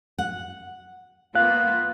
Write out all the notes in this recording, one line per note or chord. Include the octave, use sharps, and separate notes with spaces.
F#5
A#3 B3 F4 F5 F#6